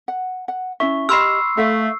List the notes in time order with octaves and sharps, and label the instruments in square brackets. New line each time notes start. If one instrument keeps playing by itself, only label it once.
[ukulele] F#5
F#5
[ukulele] C#4 E4 E5 [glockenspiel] C#6
[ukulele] G4 D#5 [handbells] B5 C6 F6 [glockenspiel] E6 C7
[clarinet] A3 [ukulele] A4 E5 F5